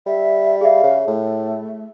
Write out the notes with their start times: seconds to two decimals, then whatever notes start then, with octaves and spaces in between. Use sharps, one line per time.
0.06 G3 E5
0.61 G#4 E5 F5
0.84 C#3
1.07 A2 A3